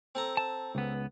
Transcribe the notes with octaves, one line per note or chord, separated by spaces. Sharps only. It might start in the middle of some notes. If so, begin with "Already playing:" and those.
C4 A4 A#5
A5
C#2 B3